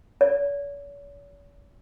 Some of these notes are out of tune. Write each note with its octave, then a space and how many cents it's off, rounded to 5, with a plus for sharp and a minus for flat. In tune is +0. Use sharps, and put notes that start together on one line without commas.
C#5 +45